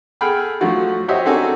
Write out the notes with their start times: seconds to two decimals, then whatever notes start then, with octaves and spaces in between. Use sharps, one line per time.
0.21 G#4 A4 F#5 G5 B5 F6
0.61 F3 F#3 A3 F4 F#4
1.08 F#4 G4 C5 C#5 D#5 E5
1.25 C4 D4 F#4 A4 A#4 G#5